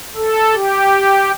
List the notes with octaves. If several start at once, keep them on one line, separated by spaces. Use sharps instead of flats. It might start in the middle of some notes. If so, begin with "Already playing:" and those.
A4
G4